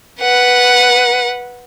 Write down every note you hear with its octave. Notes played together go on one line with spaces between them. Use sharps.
B4 F#5